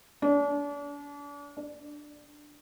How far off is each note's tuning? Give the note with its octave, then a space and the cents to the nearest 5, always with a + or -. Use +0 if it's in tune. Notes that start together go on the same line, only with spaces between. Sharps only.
D4 -40
D4 +10